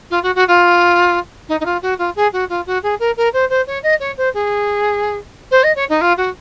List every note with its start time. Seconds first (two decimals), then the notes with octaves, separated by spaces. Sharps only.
0.10 F4
0.22 F#4
0.35 F#4
0.47 F4
1.48 D#4
1.60 D#4
1.65 F4
1.82 F#4
1.98 F4
2.15 G#4
2.32 F#4
2.49 F4
2.66 F#4
2.82 G#4
2.99 A#4
3.16 A#4
3.33 C5
3.49 C5
3.66 C#5
3.83 D#5
3.99 C#5
4.17 C5
4.33 G#4
5.51 C5
5.63 D#5
5.75 C#5
5.89 D#4
6.01 F4
6.17 F#4